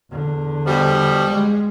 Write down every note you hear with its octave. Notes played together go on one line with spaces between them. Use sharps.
E2 D3
B2 F3 G3
G#3